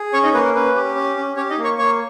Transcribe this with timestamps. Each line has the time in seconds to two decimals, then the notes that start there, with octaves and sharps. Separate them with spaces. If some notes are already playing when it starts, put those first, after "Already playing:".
Already playing: G#4
0.13 C#4 C#5 C#6
0.23 D#4 D#5
0.34 A#3 B4
0.45 A#4
0.55 C#4 B4
0.75 G4
0.95 C#4
1.17 C#4
1.36 C#4 G4 C#5
1.50 D#4 D#5
1.58 A#3
1.64 C#5 C#6
1.78 A#3 C#5 C#6